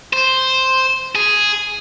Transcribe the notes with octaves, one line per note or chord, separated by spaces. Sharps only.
C5
G#4